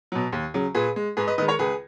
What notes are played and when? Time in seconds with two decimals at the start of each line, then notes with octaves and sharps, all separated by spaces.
0.12 B2 F#3
0.33 D#2
0.54 C#3 F#3
0.75 A#2 G#4 B4
0.96 G#3
1.17 G#2 G#4 B4
1.27 B4 D#5
1.38 D#3 B4 D#5
1.42 G#3
1.48 A#4 C#5
1.59 C#2 G#4 B4